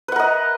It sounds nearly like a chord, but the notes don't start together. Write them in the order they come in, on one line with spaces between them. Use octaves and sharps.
B4 F#5 A#4 D#5